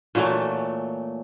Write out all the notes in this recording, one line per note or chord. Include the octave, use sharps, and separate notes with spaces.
A#2 E3 F#3 A3